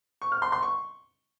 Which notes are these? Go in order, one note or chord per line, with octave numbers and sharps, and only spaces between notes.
C#6
F6
C6
C6
C#6